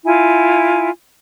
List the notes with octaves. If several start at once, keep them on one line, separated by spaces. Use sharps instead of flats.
E4 F4 G#5